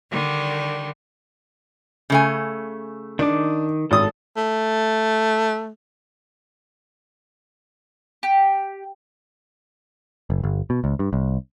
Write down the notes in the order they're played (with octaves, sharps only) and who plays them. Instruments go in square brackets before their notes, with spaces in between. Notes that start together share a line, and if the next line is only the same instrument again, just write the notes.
[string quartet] D3 D#3 G3
[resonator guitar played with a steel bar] C#3 A3 G#5
[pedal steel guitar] D#3 D6 [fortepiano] D4
[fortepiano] G#1 D#6 [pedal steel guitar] A4
[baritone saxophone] A3
[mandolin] G4
[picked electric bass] F#1
G1
B2
C#2
G2
C2